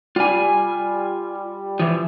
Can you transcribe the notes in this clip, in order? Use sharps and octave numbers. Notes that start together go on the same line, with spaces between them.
G3 F4 G#5
E3 F3